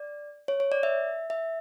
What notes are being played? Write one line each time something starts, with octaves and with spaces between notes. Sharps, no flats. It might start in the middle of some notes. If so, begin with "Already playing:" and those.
Already playing: D5
C#5
C#5
D5
E5
E5